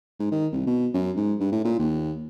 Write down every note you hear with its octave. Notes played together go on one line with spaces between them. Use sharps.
G#2
D#3
C2
B2
F#2
G#2
G2
A2
A#2
D#2